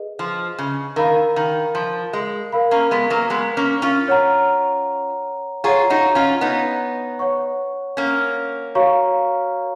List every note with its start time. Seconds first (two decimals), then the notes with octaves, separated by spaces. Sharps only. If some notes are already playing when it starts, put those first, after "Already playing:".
Already playing: G#4 B4 D#5
0.19 F3
0.58 C#3
0.96 D#3 A#4 F5 B5
1.36 D#3
1.75 F3
2.13 G#3
2.52 A#4 F5 B5
2.71 A#3 C#4
2.91 G#3 B3
3.10 F#3 A#3
3.30 G#3 B3
3.57 A#3 C#4
3.82 C#4 F4
4.08 C#5 F#5 A#5
5.64 F4 G#4 C#5 F#5 A#5 C#6
5.90 D#4 F#4
6.15 C#4 F4
6.41 B3 D#4
7.19 C#5 F#5 C#6
7.97 A#3 C#4
8.75 F#4 C#5 F5 A#5 C#6